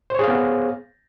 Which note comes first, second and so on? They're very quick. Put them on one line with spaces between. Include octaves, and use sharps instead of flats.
C5 C#5 G#4 F5 B3